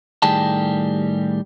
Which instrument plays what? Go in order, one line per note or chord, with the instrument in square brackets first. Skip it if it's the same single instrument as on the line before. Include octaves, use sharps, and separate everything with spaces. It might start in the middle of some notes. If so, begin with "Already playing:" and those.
[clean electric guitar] A2 D#3 G3 G4 G#4 A5